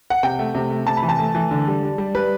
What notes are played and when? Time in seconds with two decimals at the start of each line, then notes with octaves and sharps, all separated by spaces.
0.10 F#5
0.23 C3 G5
0.39 A3
0.55 C3
0.70 A3
0.87 C3 A5
0.97 B5
1.03 E3
1.09 A5
1.19 A3
1.35 E3
1.51 D3
1.67 G3
1.83 G3
1.98 G3
2.15 G3 B4